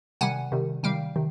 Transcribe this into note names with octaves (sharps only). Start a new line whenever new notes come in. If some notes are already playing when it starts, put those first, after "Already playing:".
C3 D#3 G3 F#5 G#5
C3 D#3 G3
C3 D#3 G3 F5 G5
C3 D#3